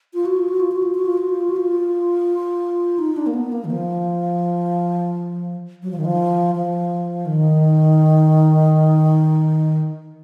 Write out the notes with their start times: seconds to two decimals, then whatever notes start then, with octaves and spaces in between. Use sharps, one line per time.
0.14 F4
0.25 F#4
0.37 F4
0.48 F#4
0.60 F4
0.72 F#4
0.83 F4
0.95 F#4
1.06 F4
1.17 F#4
1.29 F4
1.50 F#4
1.56 F4
2.99 D#4
3.17 D4
3.27 A#3
3.34 B3
3.52 A#3
3.65 D#3
3.70 F3
5.83 F#3
5.91 F3
5.98 D#3
6.05 F3
6.55 F3
7.26 D#3